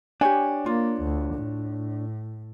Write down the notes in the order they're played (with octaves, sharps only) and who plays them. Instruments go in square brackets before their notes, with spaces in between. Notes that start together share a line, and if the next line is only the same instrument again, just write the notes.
[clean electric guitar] D4 C#5 [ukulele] G4 G#5
[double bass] A#3 [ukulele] F4
[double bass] D2
A2